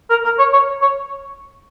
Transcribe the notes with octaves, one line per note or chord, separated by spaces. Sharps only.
A#4
A#4
C#5
C#5
C#5